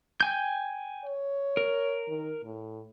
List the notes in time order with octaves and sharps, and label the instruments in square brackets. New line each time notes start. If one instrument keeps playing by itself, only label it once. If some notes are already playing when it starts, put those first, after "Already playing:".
[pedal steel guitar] G5 G#5 G6
[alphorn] C#5
[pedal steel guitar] A#4
[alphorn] D#3
A2